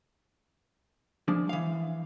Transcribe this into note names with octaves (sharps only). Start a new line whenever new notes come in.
F3 G#3 D4
E3 F5